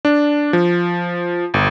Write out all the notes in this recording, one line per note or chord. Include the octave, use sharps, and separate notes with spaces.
D4
F3
G1